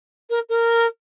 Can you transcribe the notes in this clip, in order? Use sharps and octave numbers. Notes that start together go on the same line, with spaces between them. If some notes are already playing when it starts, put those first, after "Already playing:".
A#4
A#4